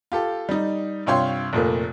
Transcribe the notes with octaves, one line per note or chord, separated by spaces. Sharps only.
F4 G4 A4
G3 D#4
G2 C3 F4 C#5 G5 C6
F1 A#2 A3 A#3